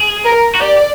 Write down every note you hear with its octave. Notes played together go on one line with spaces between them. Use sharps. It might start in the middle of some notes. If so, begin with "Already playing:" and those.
Already playing: G#4
A#4
F#4
G4 D5